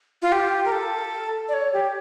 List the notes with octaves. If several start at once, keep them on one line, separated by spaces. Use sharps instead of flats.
F4
G4
A#4
A4
D5
C#5
G4